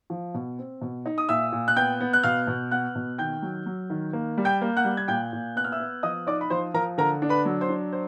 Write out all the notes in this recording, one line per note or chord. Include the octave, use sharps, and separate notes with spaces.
F3
B2
C4
B2
D#4
D#6
A#2 E5 E6
A#2
F#6
B3 G5 G6
B3
F#6
B2 F5 F6
B2
B3 F#5 F#6
B2
D#3 G5 G6
F#3
F#3
D#3
A#3
G3
G5 G6
A#3
F#5 F#6
G3
G#6
A#2 G5 G6
A#2
B3 F#6
F6
E5 E6
B3
F3 D#5 D#6
D#4 D5 D6
B5
F3 C5 C6
F3 A#4 A#5
D3 A#4 A#5
D4
B4 B5
F#3
C5 C6
D4
C5